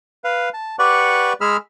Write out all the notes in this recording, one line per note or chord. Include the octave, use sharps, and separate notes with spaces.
B4 F5
A5
G4 B4 D5 F#5 C#6
G#3 G#4 B5 E6 F6